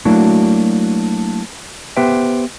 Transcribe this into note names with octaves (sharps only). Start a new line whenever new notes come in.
F#3 A3 A#3 D4 E4 F#4
B3 G4 B4 C5 E5 G5